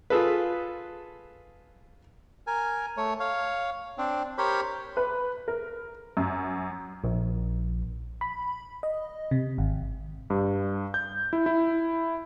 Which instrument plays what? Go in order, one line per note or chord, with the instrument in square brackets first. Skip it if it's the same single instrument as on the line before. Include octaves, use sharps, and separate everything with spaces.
[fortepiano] F4 G#4 A4 B4
[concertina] A#4 G#5
A3 C#5
C#5 F5
C4 D4
G4 A#4 C5 C#5 B5
[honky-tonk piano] B4
A#4
F#2
[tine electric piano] A#1
[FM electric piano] B5
D#5
C3
G#1
[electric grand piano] G2
G6
E4
E4